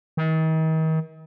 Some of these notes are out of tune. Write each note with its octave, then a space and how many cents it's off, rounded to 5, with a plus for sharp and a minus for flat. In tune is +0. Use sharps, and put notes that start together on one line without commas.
D#3 +40